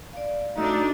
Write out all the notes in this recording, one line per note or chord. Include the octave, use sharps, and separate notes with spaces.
D5 F5
A3 D4 D#4 F#4 D#5 E6